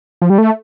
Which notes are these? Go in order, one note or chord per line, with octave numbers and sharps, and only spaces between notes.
F3
G3
A3